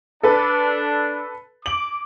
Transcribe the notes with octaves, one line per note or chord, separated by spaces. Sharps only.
D4 A4 B4
D6 F#7